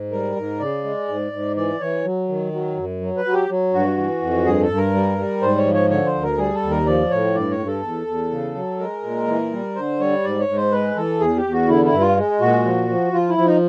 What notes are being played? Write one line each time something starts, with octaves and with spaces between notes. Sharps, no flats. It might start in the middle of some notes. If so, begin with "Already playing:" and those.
Already playing: G#2
G3 A#4
G#2
C#3 D5
G#3
G#2
G#2
E3 D5
E3 C#5
F#3
D#3
F#3
F#2
F#3
B4
F#3
G4
F#3
G2 F#4
E3
F2
G2 G#4
A4
G2
A#4
G3
G3
G#2 C5
C#5
F3
C#5
D3 C#5
C5
D2
A#4
G3 G#4
A4
D#2
A#4
F3 D5
A2 C#5
G2 D5
C#5
G2
A4
E2
E2
C#3
F#3
G#3 A#4
A#2
E3
G3
D3 C5
G3 C#5
G#2 D5
C#5
G#2
C5
G#3 B4
E3 A4
E2 G#4
G4
E2
F#4
D3 E4
E4
G2
F4
G#3
A#2 F#4
F3
F3
F3 F4
E4
F3
D#4